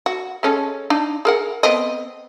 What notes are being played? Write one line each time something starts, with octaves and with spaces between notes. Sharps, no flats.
F#4
G#3 C#4 A4
D4 D#4
G#4 A#4 F#5
B3 C4 D#5